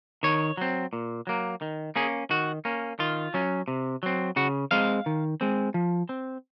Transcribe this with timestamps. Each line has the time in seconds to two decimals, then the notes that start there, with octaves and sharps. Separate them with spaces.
0.23 D#3 C#5
0.57 F#3 C4
0.93 A#2
1.27 F#3 A#3
1.62 D#3
1.96 A#3 C#4 G#4
2.30 D#3 F#4
2.65 A#3 C#4
2.99 D#3 F4
3.34 F#3 C#4
3.68 C3
4.03 F#3 C4
4.36 C#3 F#4
4.71 G#3 C4 F5
5.06 D#3
5.41 G#3 C4
5.74 F3
6.09 C4